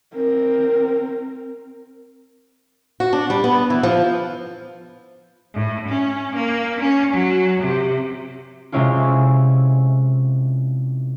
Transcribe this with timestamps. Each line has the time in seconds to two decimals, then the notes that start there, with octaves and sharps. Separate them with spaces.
0.15 C4 A#4
3.00 F#4
3.13 D4
3.30 G3
3.44 B3
3.70 E3
3.83 F3
5.54 A2
5.89 C#4
6.35 A#3
6.80 C#4
7.14 F#3
7.60 C3
8.72 C3 G#3 C4 C#4 E4 F4